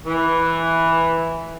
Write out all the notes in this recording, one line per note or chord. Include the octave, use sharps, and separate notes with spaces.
E3